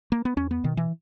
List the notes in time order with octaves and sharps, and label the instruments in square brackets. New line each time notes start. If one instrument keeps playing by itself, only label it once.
[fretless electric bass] A#3
B3
E2 C#4
B3
B2 D#3
E3